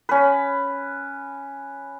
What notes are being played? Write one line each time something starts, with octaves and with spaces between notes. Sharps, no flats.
C#4 B4